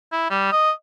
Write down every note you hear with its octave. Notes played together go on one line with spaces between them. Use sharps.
E4
G3
D#5